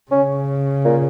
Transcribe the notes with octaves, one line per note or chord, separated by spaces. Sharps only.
C#3 C#4
A#2